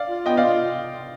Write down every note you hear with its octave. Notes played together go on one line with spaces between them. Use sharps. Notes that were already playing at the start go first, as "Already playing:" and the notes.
Already playing: D5 F5
F4
B3 D#5 G5
F4 D5 F5